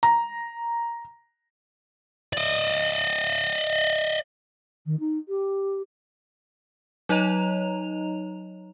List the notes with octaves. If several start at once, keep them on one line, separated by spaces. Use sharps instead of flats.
A#5
D5 D#5
D#3
D#4
G4
F#3 D#4 C#5 D#5 A#5 F7